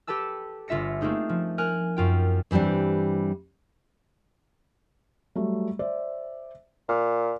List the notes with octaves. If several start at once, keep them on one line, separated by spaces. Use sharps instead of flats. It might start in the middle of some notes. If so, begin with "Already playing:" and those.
G4 A4 B4 A5 E6
G1 F4 E5 A#6 C#7
A3 A#3 C4 D#4 G#4
F3
A#4 G#5 F6 F#6
F#2 F4 G5
G2 E3 G3 C4 D4
F#3 G3 A3
C5 D5 E5
A#2 F6